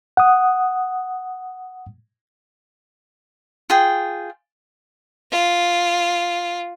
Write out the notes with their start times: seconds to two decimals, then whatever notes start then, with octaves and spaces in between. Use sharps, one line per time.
0.17 F#5 D#6
3.70 F4 G#4 G5
5.31 F4